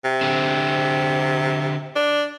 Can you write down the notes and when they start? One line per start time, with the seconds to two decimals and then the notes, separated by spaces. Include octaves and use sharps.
0.04 C3
0.21 D3 C4
1.96 D4